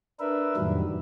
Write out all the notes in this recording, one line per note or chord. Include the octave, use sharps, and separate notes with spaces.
D4 A#4 B4 E5
F2 A2 D#3 F#3 G3